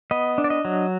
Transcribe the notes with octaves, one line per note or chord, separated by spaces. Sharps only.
B3 D#5
D4
D5
D#5
F#3